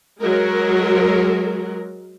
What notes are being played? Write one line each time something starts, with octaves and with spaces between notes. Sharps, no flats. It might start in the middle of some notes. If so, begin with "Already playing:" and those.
F#3 G#3 A#4